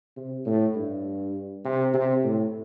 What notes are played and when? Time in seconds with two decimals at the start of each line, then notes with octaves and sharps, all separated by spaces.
0.16 C3
0.45 A2
0.76 G2
1.65 C3
1.94 C3
2.24 A2